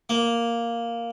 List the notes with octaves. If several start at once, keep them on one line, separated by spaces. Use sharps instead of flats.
A#3